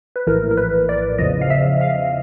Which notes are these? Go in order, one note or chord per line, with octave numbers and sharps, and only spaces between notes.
B4
A#1 A2 E3 A#4
A#4
B4
D5
E2 C#3 F3 D#5
F5
E5
F5